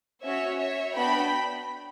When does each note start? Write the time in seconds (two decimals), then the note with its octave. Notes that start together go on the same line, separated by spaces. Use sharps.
0.23 C#4 F#4 C#5 E5
0.59 C#5 E5
0.95 B3 D4 F#4 G5 B5